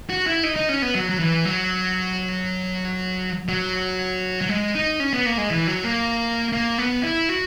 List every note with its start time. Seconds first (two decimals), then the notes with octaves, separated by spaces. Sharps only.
0.10 F#4
0.26 E4
0.43 D#4
0.56 D#4
0.69 C#4
0.82 B3
0.95 F#3
1.10 F#3
1.20 E3
1.45 F#3
3.49 F#3
4.41 F#3
4.49 G#3
4.75 D#4
5.00 C#4
5.13 B3
5.26 A#3
5.38 G#3
5.50 E3
5.67 F#3
5.84 A#3
6.52 A#3
6.78 B3
7.03 E4
7.29 F#4